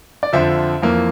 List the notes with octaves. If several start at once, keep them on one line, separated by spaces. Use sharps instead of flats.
D5
F2 D3 F3 C5 E5
F2 E3 A#3